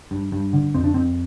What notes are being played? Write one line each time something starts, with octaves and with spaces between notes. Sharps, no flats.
G2
G2
D3
F2 C4
D4
F2 C4